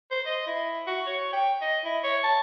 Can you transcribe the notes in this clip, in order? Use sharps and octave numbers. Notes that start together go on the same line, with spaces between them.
C5
D#5
E4
F#4
C#5
G5
D#5
E4
C#5
A5